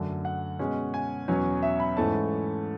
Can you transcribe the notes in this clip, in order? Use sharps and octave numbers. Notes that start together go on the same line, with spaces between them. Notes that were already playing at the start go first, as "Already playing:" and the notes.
Already playing: F#2 D3 A3
F#5
B2 G#3 C#4
G#5
E2 B2 F#3 C#4
E5
B5
G#2 E3 A3 C#4 A5